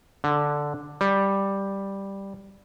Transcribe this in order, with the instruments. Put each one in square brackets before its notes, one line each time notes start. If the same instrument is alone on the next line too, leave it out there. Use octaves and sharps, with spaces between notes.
[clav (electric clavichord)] D3
G3